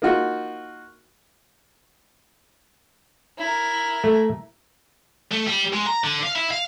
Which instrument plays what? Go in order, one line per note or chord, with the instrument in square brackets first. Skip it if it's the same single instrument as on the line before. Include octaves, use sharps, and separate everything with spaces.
[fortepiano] A#3 D#4 F4 F#4
[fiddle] E4 A#4
[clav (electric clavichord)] A3
[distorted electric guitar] A3
G3
G#3
A#5
D3
F5
E4
F5